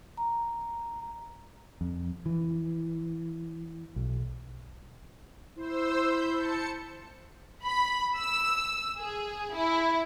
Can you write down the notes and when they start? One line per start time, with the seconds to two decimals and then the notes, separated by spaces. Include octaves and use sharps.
0.17 A#5
1.81 F2
2.26 E3
3.96 B1
5.56 E4 C5 E6
6.04 B5 G6
6.33 A5 C#7
7.65 B5
8.18 E6
9.01 G#4
9.56 E4